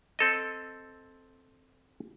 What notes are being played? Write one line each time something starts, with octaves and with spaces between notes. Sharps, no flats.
C4 A4 D#5